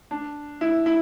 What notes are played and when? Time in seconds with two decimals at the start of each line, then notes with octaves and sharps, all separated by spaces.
0.11 D4
0.61 E4
0.86 E4